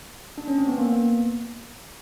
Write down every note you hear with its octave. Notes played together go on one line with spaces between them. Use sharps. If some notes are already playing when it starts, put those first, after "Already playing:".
D4
C#4
C4
B3
A#3
B3